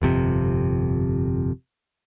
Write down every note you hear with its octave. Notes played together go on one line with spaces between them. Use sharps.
G1 F2 C3